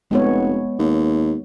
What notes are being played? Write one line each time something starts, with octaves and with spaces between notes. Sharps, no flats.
F1 G#3 B3 C#5
D#2